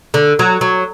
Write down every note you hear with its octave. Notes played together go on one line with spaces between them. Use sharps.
D3
F#3
F#3